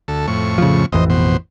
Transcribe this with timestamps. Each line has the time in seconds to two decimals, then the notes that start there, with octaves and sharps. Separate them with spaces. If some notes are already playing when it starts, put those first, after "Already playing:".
0.08 D2 A4
0.27 F2 A2 C#6
0.58 C#3 F3
0.93 A1 F2 E3 C5 D#5
1.10 B2 C5